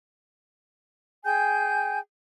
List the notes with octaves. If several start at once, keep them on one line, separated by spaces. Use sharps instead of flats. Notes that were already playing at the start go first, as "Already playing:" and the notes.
G#4 G5 G#5 G6